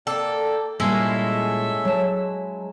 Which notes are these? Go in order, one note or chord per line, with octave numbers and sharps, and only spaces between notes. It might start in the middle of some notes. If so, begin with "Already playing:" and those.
A#3 A4 D5 G5
A#2 G3 G#3 C#4 E4 A4 E5 E6
F#3 A5